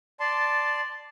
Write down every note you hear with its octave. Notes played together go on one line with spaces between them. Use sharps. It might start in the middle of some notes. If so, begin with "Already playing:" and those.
D5 A5 C6